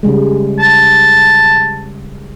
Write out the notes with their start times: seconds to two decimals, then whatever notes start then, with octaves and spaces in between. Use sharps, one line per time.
0.03 C#3 G3 G#3
0.59 A5